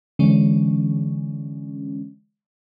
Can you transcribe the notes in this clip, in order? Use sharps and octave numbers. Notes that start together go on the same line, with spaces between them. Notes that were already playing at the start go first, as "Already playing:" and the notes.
D3 E3 G#3 C#4